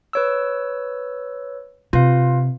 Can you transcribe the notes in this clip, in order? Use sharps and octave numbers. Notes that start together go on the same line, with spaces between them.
B4 C#5 E6
C3 F4 B4 F5